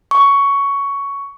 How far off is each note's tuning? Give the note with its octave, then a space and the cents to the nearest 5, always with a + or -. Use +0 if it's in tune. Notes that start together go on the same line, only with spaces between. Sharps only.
C#6 +10